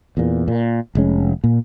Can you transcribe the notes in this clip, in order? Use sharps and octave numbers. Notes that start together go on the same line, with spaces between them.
E2 A#2
A#2
F1 G#3 C#4
A#2